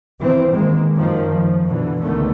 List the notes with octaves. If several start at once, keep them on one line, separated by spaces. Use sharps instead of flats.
E3 C4
D#3 G#3 A#3
F#2 D#3 F3
F3
B2 D3 E3
C#2 D3 D#3 A3 B3